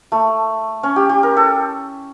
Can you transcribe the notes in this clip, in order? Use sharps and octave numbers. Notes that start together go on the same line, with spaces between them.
A3
C#4
G4
G4
A#4
A4